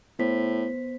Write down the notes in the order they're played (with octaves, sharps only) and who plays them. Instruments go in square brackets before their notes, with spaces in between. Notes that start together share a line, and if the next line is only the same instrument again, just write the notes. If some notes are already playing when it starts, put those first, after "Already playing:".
[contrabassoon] A2 [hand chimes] B3 C5 B6